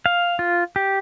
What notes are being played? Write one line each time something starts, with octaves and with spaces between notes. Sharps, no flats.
F5
F4
G4